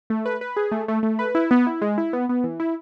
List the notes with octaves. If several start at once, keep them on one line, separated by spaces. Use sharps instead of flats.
A3
B4
B4
G#4
A3
A3
A3
B4
E4
B3
E4
G#3
E4
B3
B3
E3
E4